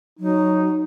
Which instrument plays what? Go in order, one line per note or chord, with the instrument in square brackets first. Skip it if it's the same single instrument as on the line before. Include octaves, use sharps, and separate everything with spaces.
[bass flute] F#3 [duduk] D#4